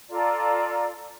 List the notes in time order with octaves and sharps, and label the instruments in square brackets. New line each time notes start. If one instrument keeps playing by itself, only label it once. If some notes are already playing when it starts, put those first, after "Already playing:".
[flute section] F4 A4 D5 A#5